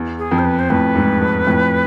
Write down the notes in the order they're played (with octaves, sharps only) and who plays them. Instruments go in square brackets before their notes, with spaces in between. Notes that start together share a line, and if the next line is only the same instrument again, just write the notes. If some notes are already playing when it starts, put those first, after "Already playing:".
Already playing: [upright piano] E2
[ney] G#4
[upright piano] F2
[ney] C5
B4
C5
[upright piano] F2 A2 [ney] B4
[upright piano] E2 G#2
F2
F2 A2